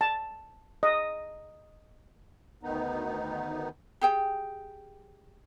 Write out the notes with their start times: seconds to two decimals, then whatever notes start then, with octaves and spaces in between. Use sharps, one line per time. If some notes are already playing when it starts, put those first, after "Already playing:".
0.01 A5
0.83 D#5
2.63 D2 D#3 B3 D#4
4.01 G4 G#4 G5